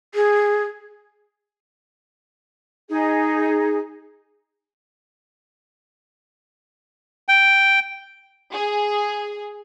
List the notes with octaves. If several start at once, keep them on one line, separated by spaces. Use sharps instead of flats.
G#4
D#4 G#4
G5
G#4